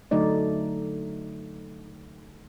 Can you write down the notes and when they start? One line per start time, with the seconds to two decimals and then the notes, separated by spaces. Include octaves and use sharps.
0.11 D3 F#3 A3 D#4 D5